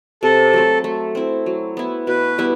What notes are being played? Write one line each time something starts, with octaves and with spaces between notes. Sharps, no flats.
C3 A4
F#3 A3 C4
A3
C4 E4
F#3
B3 E4
B2 B4
G3 B3 E4